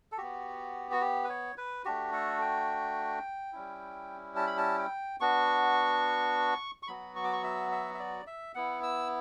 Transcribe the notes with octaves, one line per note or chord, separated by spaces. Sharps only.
A4
B3 F#4 G4
F#4
G4
B4
C#5
B4
A3 D4 F#4 G4
A4
G5
G3 C#4 E4
A5
B5
A5
G5
B3 D4 F#4 C#6
C#6
F#3 B3 F#4 B5
C#6
D6
C#6
E5
E5
E5
D5
E5
B3 E4 F#5
E6